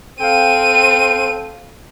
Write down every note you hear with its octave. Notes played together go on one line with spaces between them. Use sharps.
C4 A4 F5 G5 D#7